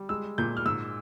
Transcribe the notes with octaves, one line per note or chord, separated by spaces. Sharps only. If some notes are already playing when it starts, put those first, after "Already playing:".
Already playing: G3
G#3 E6
A#2 G6
F6
G#2 E6